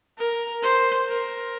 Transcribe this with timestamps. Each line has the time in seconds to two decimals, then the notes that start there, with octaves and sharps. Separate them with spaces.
0.18 A#4
0.63 C5
1.08 A#4